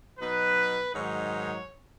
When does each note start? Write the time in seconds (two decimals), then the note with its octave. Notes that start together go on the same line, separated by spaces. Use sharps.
0.19 B2 F#3 D#4 B4
0.95 G#2 D#3 F#3 D#4 C#5